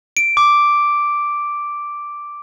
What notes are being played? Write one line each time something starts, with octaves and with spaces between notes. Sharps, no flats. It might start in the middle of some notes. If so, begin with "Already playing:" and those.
D7
D6